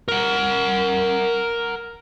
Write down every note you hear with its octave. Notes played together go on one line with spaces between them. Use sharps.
A#4 F#5